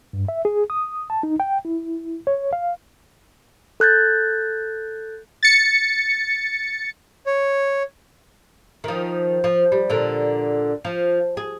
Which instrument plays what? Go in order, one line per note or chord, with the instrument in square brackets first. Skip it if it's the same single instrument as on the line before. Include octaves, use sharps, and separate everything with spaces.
[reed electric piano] G2
E5
G#4
D#6
A5
D#4
G5
E4
C#5
F5
[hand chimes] A4 F#6 G6 A6
[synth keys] A6 C#7
[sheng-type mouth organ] C#5
[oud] D#3 F3
F3
G3
A#2 D3
F3
G#4